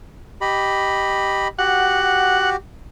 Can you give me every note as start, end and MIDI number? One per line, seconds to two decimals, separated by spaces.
0.41 1.48 67
0.41 1.48 75
0.41 1.48 83
1.59 2.56 66
1.59 2.56 67
1.59 2.50 78